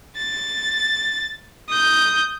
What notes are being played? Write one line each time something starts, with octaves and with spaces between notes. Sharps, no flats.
A6
D#6 G6